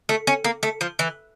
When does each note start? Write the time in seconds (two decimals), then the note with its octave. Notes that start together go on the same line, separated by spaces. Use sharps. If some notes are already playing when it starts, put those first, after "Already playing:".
0.09 A3
0.27 C#4
0.44 A#3
0.63 A3
0.81 F3
0.99 E3